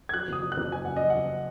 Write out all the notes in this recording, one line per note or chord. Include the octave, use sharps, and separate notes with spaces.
G#6
F#3 F#6
F#1 D#6
F#3
F#6
F#1
F#3 G#5
F#1 F#5
F#3 D#5
F#5
F#1